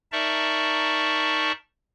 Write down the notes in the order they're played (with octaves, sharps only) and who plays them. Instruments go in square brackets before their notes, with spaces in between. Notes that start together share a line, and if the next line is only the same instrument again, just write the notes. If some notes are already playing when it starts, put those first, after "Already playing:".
[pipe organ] D#4 A#4 D5 E5 A5 C#6